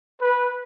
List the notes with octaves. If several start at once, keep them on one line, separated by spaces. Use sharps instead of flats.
B4